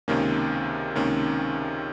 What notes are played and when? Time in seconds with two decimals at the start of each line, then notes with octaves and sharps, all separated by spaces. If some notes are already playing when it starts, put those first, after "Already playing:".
0.08 C#2 C3 D#3 A#3 C#4
0.95 C#2 C3 D#3 A#3 C#4